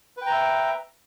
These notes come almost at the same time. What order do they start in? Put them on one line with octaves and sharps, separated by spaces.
B4 G5 A#5 E5